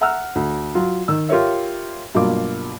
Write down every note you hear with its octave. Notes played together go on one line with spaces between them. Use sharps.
E5 F#5 A#5 E6 F6
D2
F#3 F4
D#3 E6
F4 G4 A#4 C#5 E5
G2 B2 F#3 A#3 F4 D6